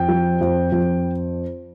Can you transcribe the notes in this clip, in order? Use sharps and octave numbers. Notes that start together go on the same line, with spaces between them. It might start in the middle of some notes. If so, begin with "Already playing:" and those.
Already playing: F2 G5
F3
F2
F2